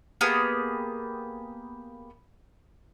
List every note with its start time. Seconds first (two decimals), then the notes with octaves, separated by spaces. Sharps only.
0.21 A#3 B3 G4 G#4